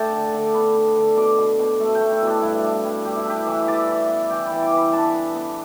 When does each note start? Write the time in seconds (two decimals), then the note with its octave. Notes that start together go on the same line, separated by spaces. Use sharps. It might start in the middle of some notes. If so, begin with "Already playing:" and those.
Already playing: A3 D4 G5 A5
0.13 D3
0.34 D3
0.54 B3 B5
0.75 D4
0.96 D3
1.17 B2 D6
1.38 B2
1.59 B2
1.80 A3
1.95 G5
2.01 A3
2.11 E4
2.22 B2 D4
2.42 G2 E4
2.64 D4
2.84 G3
3.05 G3 G4
3.17 E4
3.26 D4 G4
3.47 E3
3.68 E3 D5
3.89 E3
4.09 B3
4.30 E3 G5
4.46 B5
4.52 E3
4.63 D6
4.73 E3 B5
4.93 D4 A5
5.14 B3
5.35 B3